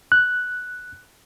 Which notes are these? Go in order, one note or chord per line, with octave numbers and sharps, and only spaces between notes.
F#6